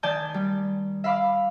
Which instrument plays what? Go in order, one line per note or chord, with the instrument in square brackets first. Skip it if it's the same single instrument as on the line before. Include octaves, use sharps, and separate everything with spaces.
[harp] D#3 D5 G#5 A5 G6
G3
E5 F5 B5 D6